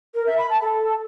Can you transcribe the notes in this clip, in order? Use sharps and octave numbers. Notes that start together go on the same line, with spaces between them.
A#4
E5
B5
A5
A4